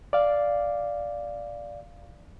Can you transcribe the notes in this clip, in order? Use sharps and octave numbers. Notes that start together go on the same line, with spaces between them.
D5 F5